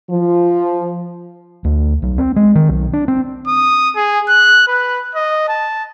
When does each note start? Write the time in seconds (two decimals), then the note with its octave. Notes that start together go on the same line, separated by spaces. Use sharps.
0.10 F3
1.64 D2
2.02 B1
2.18 C4
2.36 G#3
2.55 D#3
2.69 B1
2.93 D4
3.08 C4
3.48 D#6
3.96 G#4
4.29 F#6
4.68 B4
5.15 D#5
5.48 A5